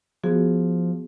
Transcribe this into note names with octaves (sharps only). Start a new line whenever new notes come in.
F3 B3 F#4 G#4